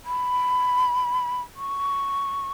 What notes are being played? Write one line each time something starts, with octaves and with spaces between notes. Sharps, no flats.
B5
C#6